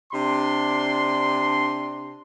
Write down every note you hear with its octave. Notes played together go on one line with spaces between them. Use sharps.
C3 D4 C6